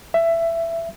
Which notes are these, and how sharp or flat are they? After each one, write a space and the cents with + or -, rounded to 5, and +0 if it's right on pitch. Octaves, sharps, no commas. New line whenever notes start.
E5 +15